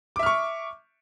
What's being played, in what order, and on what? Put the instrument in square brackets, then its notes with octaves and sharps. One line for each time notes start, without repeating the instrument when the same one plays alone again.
[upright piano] D6
E5
F6
C#6